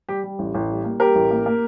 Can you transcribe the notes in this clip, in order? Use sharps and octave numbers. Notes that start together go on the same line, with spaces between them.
G3 G4
G3
A1
A1
G3
A#3
G3 G4 A#4
A1
A#3
A#3